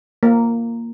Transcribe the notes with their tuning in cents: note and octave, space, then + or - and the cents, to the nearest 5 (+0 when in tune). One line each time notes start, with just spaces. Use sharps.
A#3 -5